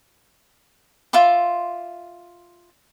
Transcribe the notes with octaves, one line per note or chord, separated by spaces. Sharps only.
F4 E5 C6 D6